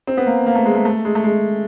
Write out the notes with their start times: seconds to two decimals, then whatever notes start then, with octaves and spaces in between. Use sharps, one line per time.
0.07 C4
0.17 B3
0.26 A#3
0.46 A#3
0.55 A3
0.66 G#3
0.75 A3
0.85 A3
1.05 G#3
1.15 A3
1.24 G#3